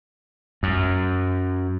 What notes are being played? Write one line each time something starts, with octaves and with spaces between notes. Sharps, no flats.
F#2